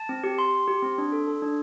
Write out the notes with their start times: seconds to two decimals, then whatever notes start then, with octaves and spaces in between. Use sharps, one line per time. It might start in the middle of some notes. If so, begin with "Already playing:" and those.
Already playing: A5
0.09 C4
0.24 G4
0.38 G4 C6
0.53 G4
0.68 G4
0.82 C4
0.98 D4
1.12 A4
1.28 A4
1.42 D4